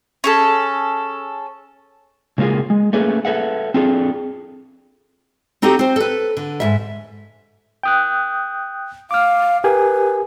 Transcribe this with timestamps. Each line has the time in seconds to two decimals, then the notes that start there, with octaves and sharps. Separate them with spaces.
0.24 C#4 G#4 A4
2.38 C#3 G#3 A#3 F4 G#4
2.70 G#3
2.93 A3 A#3 C#4 G#4 B4
3.25 A4 B4 E5 F#5
3.74 C4 D4 F4 G#4 A4
5.62 C4 D#4 F#4 G4 A4
5.79 C4 C5
5.96 A4 B4
6.37 D3
6.60 G#2 D#3 E5
7.83 G5 D#6 F#6
9.11 F5 D6 F6
9.64 G4 A#4 B4 G#5